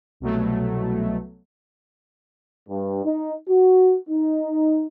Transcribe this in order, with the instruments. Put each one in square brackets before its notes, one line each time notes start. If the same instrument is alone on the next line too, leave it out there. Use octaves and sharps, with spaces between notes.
[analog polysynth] C2 B2 F#3 A3
[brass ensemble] G2
D#4
F#4
D#4